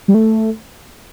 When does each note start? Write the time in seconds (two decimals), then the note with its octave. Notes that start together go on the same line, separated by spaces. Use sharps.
0.08 G3
0.14 A3